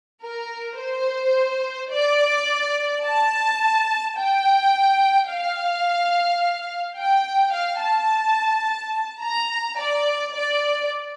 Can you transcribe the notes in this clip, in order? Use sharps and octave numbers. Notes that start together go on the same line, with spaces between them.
A#4
C5
D5
A5
G5
F5
G5
F5
A5
A#5
D5
D5